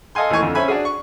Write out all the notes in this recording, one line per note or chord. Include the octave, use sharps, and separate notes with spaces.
A4 D#5 F5 G#5 C6
D#2 E3 A3 G#5 C#6
F2 D3
C#4 C5 E5 G#5 B5
D4 F#4 G#4
C#6